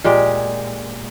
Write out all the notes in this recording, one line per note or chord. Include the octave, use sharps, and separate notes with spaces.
A#2 G#3 G4